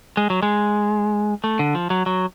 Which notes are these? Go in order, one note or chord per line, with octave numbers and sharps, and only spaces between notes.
G#3
F#3
G#3
A3
D3
F3
F#3
F#3